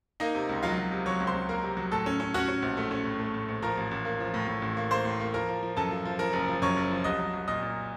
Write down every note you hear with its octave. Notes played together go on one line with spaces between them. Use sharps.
A#3 D#4 D#5
C3
C#2
F#3 F4 F5
F#3
C3
F#3 C#5 C#6
C#2
C5 C6
C#2
A#3 A#4 A#5
C3
F#3
A2 A4 A5
C#4
C#4
C#4 F#4 F#5
C#4
A#1
A3
C#4
A2
A3
A2
A#1
F3 A#4 A#5
A1
A1
A#3
F3
A2
A2
A1
A#3
A#3 C5 C6
A2
A#3
F3 A#4 A#5
F3
F3
F#2 A4 A5
F3
F3
F3 A#4 A#5
F#1
F3
F#2 C#5 C#6
F#1
F3
C2 D#5 D#6
F#3
C2
A#2 D#5 D#6
A#2